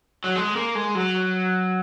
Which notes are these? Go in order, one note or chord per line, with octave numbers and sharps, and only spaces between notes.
F#3
G#3
A#3
G#3
F#3